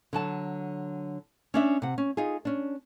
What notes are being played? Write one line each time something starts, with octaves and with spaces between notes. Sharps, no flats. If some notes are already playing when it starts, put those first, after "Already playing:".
D3 F#3 A5
C#4 D4 E5
C3 F#5
C#4
D#4 F4 G#4
C#4 D4